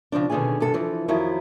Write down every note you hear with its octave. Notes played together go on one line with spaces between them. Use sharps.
C#3 F3 C4 D4
B2 D3 D#3 C#4 G#4 G#5
G2 C3 A4
E3 F3
F2 D#3 F3 F#3 E4